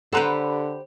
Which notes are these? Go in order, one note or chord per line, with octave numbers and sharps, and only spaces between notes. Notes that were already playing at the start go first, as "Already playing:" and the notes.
D3 G4 A4 B4 C5 F#5 A#5